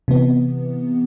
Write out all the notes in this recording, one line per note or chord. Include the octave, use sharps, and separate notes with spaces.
C3 E3 B3